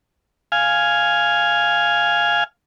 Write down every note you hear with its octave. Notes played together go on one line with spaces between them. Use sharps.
F5 G#5